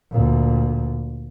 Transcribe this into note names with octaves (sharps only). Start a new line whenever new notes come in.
D2 A#2